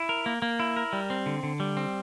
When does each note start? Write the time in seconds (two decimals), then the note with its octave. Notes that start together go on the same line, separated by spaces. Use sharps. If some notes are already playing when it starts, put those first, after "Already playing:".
Already playing: E4
0.09 A#4
0.26 A#3
0.42 A#3
0.60 E4
0.77 A#4
0.93 G3
1.10 C4
1.26 D3
1.43 D3
1.60 G3
1.77 C4